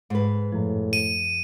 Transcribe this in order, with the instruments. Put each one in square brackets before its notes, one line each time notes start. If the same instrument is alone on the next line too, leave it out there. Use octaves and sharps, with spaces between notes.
[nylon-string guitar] G#2 B4
[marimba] F#2 F3 [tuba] A2
[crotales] D#7